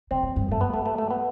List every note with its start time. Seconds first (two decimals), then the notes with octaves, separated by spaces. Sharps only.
0.11 C3 C4
0.23 A2
0.36 G2
0.48 F#2 A3
0.61 B3
0.74 A3
0.86 A3
0.98 A3
1.10 B3